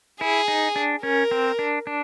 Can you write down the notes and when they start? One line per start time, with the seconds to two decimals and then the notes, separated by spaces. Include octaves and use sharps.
0.21 E4 G#4
0.48 D#4
0.76 D4
1.03 C#4 A#4
1.31 C4
1.59 D4
1.87 D4